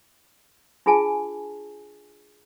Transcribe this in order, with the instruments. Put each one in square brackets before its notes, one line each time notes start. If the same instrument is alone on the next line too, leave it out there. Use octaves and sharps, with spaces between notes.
[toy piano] D4 F4 G#4 G#5 A5